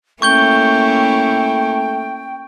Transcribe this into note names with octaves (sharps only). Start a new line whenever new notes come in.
A3 A#3 C#4 E4 G5 C#6 G6 G7